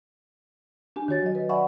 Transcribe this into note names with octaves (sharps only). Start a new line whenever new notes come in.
D4 G4 G#5
D#3 F#4 C#5 A6
F#3 D#5
B4
D5 E5 F#5 G#5 B5 C#6